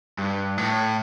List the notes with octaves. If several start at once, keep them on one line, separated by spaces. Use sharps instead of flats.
G2
A2